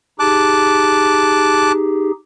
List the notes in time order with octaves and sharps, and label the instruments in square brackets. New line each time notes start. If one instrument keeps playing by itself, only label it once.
[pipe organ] D#4 G4 G#4 [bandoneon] A5 D6 F#6